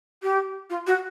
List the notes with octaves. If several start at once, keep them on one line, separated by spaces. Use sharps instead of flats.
G4
F4
F#4